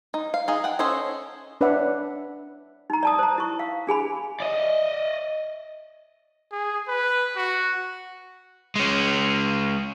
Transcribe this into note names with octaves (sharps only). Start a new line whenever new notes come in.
D#4
F5
D#4 G#4
F#5 G5
C#4 A4 C5 C#5 D#5
D4 B4 C#5 D5 E5 F#5
D#4 A#5
D5 A5 D#6
C5 A#5
E4 C#6
F5
D4 G#4 G#5 B5
D5 D#5
G#4
B4
F#4
G#3 C#4